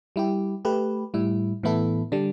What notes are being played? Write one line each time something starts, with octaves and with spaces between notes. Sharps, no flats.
G3 E4 G4
A3 G4 B4
A2 G3 E4
A2 E3 B3 E4 A4
D3 G3 D4